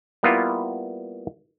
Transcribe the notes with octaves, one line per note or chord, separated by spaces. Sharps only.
G3 A#3 B3 E4 F4